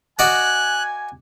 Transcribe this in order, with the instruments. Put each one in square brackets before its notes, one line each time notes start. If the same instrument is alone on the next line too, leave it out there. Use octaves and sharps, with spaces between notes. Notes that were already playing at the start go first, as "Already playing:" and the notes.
[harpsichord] F#4 D5 D#5 [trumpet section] G#5 [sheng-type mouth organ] F#6